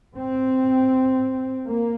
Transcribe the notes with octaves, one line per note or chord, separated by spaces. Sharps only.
C4
A#3